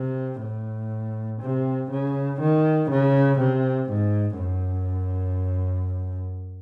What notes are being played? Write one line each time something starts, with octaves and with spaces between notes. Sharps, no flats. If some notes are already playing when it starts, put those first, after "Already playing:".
Already playing: C3
A2
C3
C#3
D#3
C#3
C3
G#2
F#2